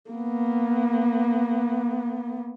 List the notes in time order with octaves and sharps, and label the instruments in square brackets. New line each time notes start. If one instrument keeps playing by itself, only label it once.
[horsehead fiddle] A#3 B3